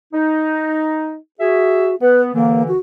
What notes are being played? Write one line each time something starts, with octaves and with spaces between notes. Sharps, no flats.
D#4
F#4 G#4 E5
B3 B4
D#2 D3 E3 A#3
F#4